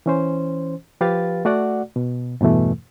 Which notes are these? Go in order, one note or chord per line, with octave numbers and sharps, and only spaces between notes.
E3 C#4 C5
F3 G4 B4 F5 A6
A3 F#4 D5 F#5
B2
E2 G2 B2 E3 A3